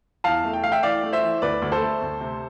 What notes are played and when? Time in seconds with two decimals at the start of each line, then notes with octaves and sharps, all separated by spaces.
0.24 E2 F5 A5
0.45 A3
0.53 G5
0.64 A3 F5
0.72 E5 G5
0.83 E3 D5 F5
1.03 A3
1.13 C5 E5
1.22 E3
1.42 D2 B4 D5
1.62 D2
1.72 A4 C5
1.82 A3
2.02 D2
2.20 C3